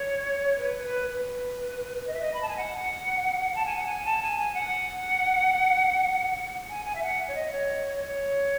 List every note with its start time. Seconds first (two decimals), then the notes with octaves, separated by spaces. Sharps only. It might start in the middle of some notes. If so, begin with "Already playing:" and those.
Already playing: C#5
0.58 B4
0.83 B4
1.08 B4
2.07 D#5
2.14 E5
2.22 D#5
2.34 B5
2.42 A5
2.48 G#5
2.57 F#5
3.55 A5
3.66 G#5
3.76 F#5
3.86 G#5
4.05 A5
4.22 G#5
4.39 G#5
4.54 F#5
6.70 G#5
6.85 G#5
6.95 E5
7.03 F#5
7.28 C#5
7.35 D#5
7.52 C#5
8.01 C#5